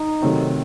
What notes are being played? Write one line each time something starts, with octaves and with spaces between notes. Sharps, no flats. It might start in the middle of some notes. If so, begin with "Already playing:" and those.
Already playing: D#4
C3 D#3 F#3 A3 C4